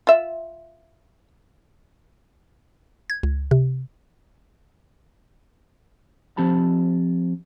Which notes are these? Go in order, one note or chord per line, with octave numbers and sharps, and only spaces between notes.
F4 E5
G#6
C#2
C3
F3 C4 G4 A5 B5